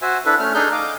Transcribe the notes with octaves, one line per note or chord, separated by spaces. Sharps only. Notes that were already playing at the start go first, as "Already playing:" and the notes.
F#4 C5 E5 G#5
D4 E4 A4 B4
A3 C#4 F6
D4 D#4 G#4 A4 F6 G6
D#5 F5 D6